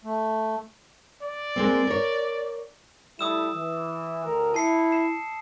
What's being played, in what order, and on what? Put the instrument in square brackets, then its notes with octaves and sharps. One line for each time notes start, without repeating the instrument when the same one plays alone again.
[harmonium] A3
[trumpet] D5
[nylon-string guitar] G#3 A#3 C4
A#4 C#5
[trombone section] G3 A3 E4 [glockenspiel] D#6 E6 E7
[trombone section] E3
D2 A#4
[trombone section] E4 [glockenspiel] A5 C7 C#7
[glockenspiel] C7 E7